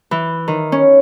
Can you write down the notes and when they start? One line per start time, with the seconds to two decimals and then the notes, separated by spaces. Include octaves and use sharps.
0.11 E3
0.48 D#3
0.72 C#4